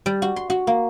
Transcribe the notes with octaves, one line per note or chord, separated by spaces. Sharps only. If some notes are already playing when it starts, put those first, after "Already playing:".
G3
F#4
C6
F#4
A#3